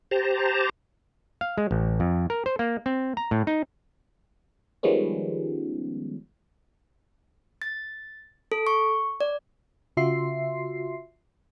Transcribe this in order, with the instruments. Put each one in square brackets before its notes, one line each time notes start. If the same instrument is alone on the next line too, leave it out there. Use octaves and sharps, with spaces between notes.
[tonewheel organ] G4 C5 A5 A#5
[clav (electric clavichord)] F5
G#3
A1
F2
A#4
C5
A#3
C4
A#5
A2
D#4
[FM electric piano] D#3 F3 G3 G#3 B3 C#4
[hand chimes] A6
A4
C#6
D5
[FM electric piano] C#3 F4 F#4 E5 C6 C7